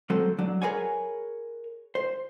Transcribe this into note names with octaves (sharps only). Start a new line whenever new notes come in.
F#3 A3 C4 A4
F#3 D4
G#4 A#4 B4 C#5 F#5 G#5
C5